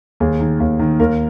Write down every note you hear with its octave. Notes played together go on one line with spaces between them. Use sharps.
D#2 G#4
D#3
D#2
D#3
D#2 A#4